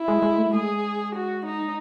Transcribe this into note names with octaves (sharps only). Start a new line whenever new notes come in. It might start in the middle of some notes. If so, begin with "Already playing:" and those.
Already playing: E4
G#3
G#3
A3
G#3 G#4
F#4
D#4